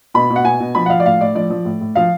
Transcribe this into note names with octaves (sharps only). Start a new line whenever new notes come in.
B2 B5
B2
F#5
B2 G#5
B2
F3 B5
F#5
F3 F5
D5
A2 F5
A2 D5
F3 D5
F3
A2
A2
F3 F5